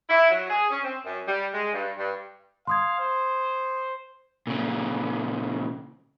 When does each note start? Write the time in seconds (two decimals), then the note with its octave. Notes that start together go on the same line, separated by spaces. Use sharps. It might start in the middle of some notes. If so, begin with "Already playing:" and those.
0.10 E4
0.30 F#3
0.50 G#4
0.70 C#4
0.84 C4
1.05 F#2
1.27 G3
1.54 G#3
1.73 G2
1.97 G2
2.67 F5 C6 D#6 G#6
2.99 C5
4.47 A#2 C#3